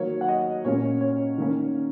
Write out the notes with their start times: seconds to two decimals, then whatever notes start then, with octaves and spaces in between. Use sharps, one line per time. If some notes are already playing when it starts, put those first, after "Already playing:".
Already playing: D#3 F#3 A#3 C#5
0.21 F#5
0.28 D#5
0.65 A#2 A#3 C#4 C#5
1.01 C#5
1.38 D#3 A#3 C#4